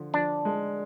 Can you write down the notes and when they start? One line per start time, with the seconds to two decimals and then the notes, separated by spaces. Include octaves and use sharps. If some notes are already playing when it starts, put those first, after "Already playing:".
Already playing: D3 F3
0.14 F3 D4
0.45 G#3